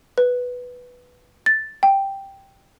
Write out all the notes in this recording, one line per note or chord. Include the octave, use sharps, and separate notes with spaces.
B4
A6
G5